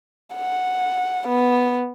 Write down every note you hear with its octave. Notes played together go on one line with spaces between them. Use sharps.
F#5
B3